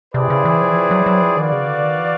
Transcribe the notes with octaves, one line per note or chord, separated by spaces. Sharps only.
C3 C4 E4 G#4 B4 D5
C#3
E3
F3
E3
F3
F#3
F#3
F3
D#3 F#4 B4 D5 F5
C#3
D3
D#3
E3